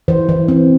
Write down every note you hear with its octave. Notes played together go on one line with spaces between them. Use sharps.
E3 C5
E3
C4